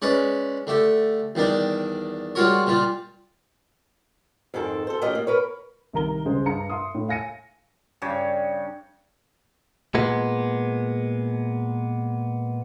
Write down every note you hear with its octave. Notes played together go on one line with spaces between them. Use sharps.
G#3 C#4 B4 D5
D3 A3 G4
E2 D#3 G3 D4 D#4
G3 G#3 F4 F#4 A#4 C#5
A#2 G3 F4
F2 G#2 D#3 C4 A4
A4 C5
D#3 A3 C#4 F4 G4 D#5
A#3
A#4 B4 C#5
C2 D#3 A#4 A#5 G7
G1 C#2 G#3 C5
G2 A#5 C#7
E5 F5 C6 D#6
A2
F5 G#5 A#6 C#7 D#7
G2 C#3 C#5
A#2 G#3 B3